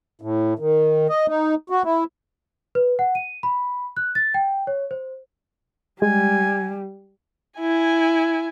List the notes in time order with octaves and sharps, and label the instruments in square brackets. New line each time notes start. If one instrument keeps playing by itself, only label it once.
[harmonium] A2
D#3
D#5
D#4
F#4
E4
[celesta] B4
F#5
D#7
B5
F#6
A6
G5
C#5
C5
[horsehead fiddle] G3 [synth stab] G#3 [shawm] G#5
[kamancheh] E4 G#5